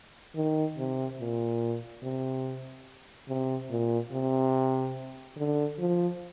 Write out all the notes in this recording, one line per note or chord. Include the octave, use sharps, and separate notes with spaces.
D#3
C3
A#2
C3
C3
A#2
C3
D3
F3